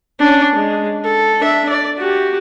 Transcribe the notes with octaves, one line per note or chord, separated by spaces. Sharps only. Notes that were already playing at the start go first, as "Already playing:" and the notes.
C#4 D4
G#3
A4
D4 E5
D5
F#4 G4